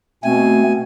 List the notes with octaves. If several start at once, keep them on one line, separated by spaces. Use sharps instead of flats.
B2 A3 C4 G#5